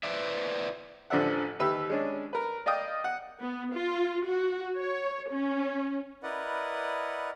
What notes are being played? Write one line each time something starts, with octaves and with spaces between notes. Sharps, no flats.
E4 B4 C5 D5 E5
A1 D3 F3 D5 E5 F#5
D#2 G4 B4 E5 E6
G#3 C#4 D4
A#4 B4
D5 D#5 F5 G5 D#6
F#5
B3
F4
F#4
C#5
C#4
E4 A#4 B4 D5 D#5 F#5